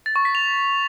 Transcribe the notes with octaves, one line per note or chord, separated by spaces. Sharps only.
A6
C#6
B6
F7